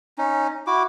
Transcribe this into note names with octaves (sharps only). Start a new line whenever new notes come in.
C#4 D#4
E4 F#4 D6